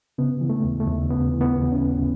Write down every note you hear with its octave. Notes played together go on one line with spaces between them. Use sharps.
C#3 B3
E3
A3
D#2
A3
D#2
C#3 B3
E3
B3
D#2
C#4
D#2